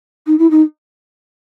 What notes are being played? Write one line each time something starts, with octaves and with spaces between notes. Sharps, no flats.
D#4
E4
D#4